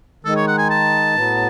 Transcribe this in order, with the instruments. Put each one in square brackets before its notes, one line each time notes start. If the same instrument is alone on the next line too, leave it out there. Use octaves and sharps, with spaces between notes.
[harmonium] D#3 G#3 D#4 [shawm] A4
[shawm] C#5
F#5
G#5
A5
[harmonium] A2 F#3 B3